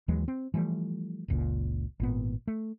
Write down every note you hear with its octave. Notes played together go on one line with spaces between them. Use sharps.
D#2 E3 F#3 G#3
C4
E3 F3 G3 A3
F#1 C#2 A#2
G#1 A#2 B3
A3